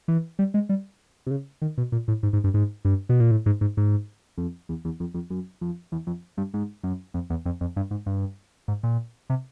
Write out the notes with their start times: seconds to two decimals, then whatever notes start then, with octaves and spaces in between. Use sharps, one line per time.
0.08 E3
0.39 G3
0.54 G#3
0.69 G3
1.26 C3
1.31 C#3
1.62 D#3
1.78 B2
1.92 A#2
2.08 A2
2.23 G#2
2.33 G#2
2.44 G2
2.54 G#2
2.85 G2
3.09 B2
3.20 A#2
3.31 A2
3.46 G#2
3.61 G#2
3.77 G#2
4.38 F2
4.69 E2
4.85 E2
5.00 F2
5.14 F2
5.30 F#2
5.61 F2
5.92 E2
6.07 F2
6.38 G2
6.54 G#2
6.83 F#2
7.14 F2
7.30 E2
7.45 F2
7.61 F2
7.76 G2
7.91 G#2
8.06 G2
8.68 G#2
8.83 A#2
9.30 C3